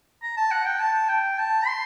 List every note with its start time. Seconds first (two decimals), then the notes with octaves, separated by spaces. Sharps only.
0.22 A#5
0.36 A5
0.51 F#5
0.66 G5
0.80 A5
1.09 G5
1.38 A5
1.67 C6